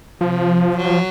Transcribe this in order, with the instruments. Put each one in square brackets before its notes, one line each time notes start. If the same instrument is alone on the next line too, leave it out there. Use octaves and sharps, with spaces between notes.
[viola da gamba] C3 [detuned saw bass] F3
[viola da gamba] F#3